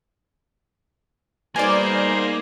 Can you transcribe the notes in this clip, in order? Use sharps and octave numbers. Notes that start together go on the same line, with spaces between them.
B2 G3 A#3 D#4 G#4 C5 D5 G#5